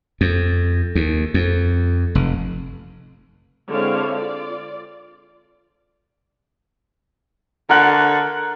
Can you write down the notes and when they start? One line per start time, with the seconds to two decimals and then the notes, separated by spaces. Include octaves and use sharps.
0.21 F2
0.95 D#2
1.34 F2
2.15 F1
3.70 D3 G#3 C4 E4 C#5 F5
4.15 F4 D5
7.70 D3 A#4 F#5